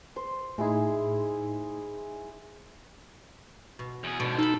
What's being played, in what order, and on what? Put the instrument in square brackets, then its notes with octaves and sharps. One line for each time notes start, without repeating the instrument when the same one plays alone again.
[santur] C5
[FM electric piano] A2 D#4 [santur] G#3 E4 G#4
[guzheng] B2
[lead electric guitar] E2 G#4
[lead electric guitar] G#2 D3 [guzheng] B2
[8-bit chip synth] D#4 [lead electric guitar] A4 [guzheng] F5 B5